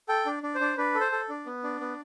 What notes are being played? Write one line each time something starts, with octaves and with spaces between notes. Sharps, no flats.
A4 G5
D4
D4
C5
D4
D4 B4
A4
C5
A4
D4
B3
D4
B3